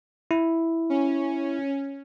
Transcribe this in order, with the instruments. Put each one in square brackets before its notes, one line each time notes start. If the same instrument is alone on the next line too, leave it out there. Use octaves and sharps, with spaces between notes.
[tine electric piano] E4
[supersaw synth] C#4